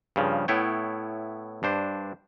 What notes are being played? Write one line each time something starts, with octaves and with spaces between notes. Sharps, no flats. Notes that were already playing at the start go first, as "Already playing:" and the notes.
G2 C#3 F3
A2 B3 E4 C#5 G5
G2 D4 C5